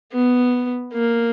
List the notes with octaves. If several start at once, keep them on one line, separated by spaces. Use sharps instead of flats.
B3
A#3